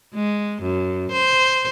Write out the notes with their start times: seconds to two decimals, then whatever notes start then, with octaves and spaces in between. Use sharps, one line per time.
0.14 G#3
0.62 F#2
1.12 C5